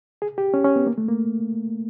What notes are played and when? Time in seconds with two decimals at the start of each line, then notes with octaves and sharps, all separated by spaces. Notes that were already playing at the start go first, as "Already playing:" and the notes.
0.22 G#4
0.38 G4
0.54 C#4
0.65 C#4
0.76 B3
0.87 A#3
0.98 A3
1.08 A#3